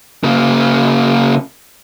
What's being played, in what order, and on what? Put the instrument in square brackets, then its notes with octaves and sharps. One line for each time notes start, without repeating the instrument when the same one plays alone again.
[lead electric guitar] C#3 A#3